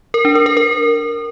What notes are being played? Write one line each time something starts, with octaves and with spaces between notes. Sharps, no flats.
A#4
D4
A#4
A#4
A#4